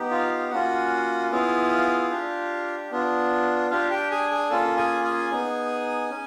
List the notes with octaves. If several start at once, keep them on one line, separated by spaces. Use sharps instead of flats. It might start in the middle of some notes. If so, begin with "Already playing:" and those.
Already playing: B3 D#4 G4
F4 F5
A#3 C#4 F4 F#4 F#5
B3 E4 F4 G#4 F5
D4 G4
B3 D4 F4
D4 F4 G4 F5
G4 G5
G#4 G#5
G#4 G#5
A#3 C#4 F4 A4 A5
G#4 G#5
G#4 G#5
B3 D#4 G#4
C#4